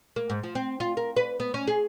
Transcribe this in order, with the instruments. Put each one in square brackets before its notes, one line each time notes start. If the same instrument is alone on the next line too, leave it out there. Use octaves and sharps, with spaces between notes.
[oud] A#3
G#2
F3
C4
F4
A#4
B4
B3
C#4
G#4